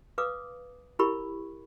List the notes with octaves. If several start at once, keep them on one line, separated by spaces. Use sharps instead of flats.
B4 F5 D6 D#6
E4 G4 A#4 B5 C#6